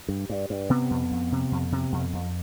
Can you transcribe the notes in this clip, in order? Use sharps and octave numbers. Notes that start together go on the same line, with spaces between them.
G2
G2
G2
C3 B3
F2
F2
C3
F2
C3
F2
F2